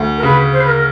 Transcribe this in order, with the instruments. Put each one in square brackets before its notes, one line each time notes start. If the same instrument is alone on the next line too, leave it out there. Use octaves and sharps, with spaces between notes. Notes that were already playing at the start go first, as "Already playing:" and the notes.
Already playing: [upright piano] D2
[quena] A#4
[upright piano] C#3 [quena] B4
[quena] C5
B4
A#4